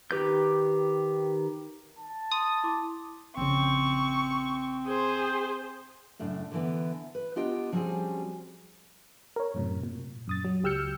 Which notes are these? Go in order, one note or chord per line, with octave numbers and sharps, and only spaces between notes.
D#3 G4 B4 G6
A5
C6 D#6
E4 C6 D6
A#1 C#3 C4 C#6
G#4 C5
F#2 A2 C#3 D4
D3 E3 B3
B4
B3 D4 F4 G4 D#5 G5
F3 G3 C4 C#4 F#4 G#4
A#4 C#5
F#2 A2 C3
A#2
F#2 D#6 A6
F#3
C#2 G4 E6 F6 G6 C#7